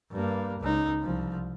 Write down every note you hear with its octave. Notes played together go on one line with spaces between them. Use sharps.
G2 A#3
C#2 D#4
C2 F3